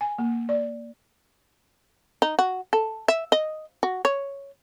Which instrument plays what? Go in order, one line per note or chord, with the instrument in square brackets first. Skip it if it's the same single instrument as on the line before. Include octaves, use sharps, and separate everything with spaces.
[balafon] G#5
A#3
D5
[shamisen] D#4
F#4
A4
E5
D#5
F#4
C#5